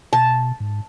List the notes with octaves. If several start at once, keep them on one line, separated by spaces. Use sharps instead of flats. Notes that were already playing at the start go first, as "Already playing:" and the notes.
B2 A5
G#2